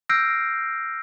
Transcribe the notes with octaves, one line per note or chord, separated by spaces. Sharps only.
E6 F6 G6 A#6 C7 D7